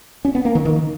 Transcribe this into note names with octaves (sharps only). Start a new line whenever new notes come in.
C#4
B3
A#3
D#3
D#3